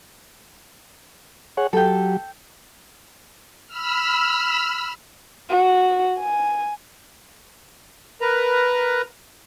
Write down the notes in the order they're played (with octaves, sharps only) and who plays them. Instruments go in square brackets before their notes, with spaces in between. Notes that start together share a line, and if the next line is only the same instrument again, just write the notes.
[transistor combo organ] G#4 C#5 F#5
[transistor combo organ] F#3 G4 [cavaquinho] A4 G5
[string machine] B5 E6 F6
[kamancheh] F#4
G#5
[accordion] A#4 B4 A#5